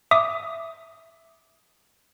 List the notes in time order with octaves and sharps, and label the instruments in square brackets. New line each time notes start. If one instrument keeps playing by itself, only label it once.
[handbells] E5 D6 D#6